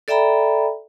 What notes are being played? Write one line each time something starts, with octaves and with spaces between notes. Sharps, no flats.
A4 D5 E5 G5 A#5 B5